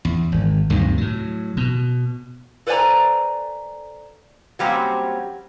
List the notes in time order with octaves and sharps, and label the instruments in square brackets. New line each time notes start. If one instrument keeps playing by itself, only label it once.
[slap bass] E2
G#1
D2 G2 C3 D#3
A2 F#3
B2
[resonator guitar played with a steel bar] A4 B4 C5 D5 G#5 A#5
F#3 G3 A#3 C4 C#4